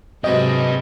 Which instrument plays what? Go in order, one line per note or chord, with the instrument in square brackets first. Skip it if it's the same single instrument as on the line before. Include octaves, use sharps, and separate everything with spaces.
[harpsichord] C3 F#3 [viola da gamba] G#3 C4 [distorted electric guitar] G4 B4 [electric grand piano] D#5